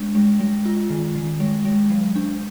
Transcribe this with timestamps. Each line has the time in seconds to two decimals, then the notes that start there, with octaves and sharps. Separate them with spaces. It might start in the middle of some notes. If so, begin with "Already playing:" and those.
Already playing: G#3 D4
0.15 G#3
0.40 G#3
0.66 F4
0.90 D#3
1.16 D#3
1.40 G#3
1.65 G#3
1.90 F#3
2.16 D4